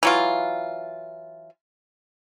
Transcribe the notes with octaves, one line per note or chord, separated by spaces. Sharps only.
E3 F#3 F4